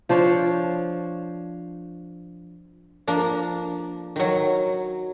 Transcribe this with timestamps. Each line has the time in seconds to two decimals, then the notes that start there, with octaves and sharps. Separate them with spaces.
0.09 F3 D4 C5 C#5
3.07 F3 A#3 D4
4.16 D#3 F#3